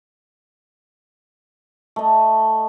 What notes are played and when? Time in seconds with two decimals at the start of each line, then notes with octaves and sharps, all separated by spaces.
1.96 A3 D#5